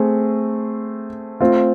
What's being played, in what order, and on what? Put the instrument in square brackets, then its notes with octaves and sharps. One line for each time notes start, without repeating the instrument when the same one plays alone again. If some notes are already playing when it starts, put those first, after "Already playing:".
Already playing: [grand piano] A3 C4 G#4
A3 C4 F4